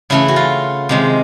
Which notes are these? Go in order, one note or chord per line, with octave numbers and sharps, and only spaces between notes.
C#3 E3 A3 E4
F#4
F4
C3 D#3 G#3